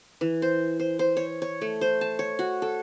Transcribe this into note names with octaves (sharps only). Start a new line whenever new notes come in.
E3
C5
C5
C5
C#5
C#5
A3
C5
A5
C#5
F#4
A4